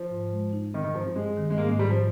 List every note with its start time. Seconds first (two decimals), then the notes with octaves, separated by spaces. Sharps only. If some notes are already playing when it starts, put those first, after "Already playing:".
Already playing: F3
0.10 G#2
0.32 G#3
0.53 D#4
0.74 D#3 C4
0.84 D#3
0.94 G2 F3
1.06 F3
1.16 G#3 G4
1.37 D#3
1.50 G#3
1.58 G#2 A#3
1.69 G#3
1.79 G#2 G3
1.90 F3